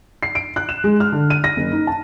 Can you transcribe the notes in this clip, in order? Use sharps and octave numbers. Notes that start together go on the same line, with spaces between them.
C7
D7
F#6
E7
G#3
F6
D3
D#7
A#6
F#1
D#4
A5